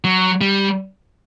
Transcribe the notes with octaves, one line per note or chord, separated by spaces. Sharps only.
F#3
G3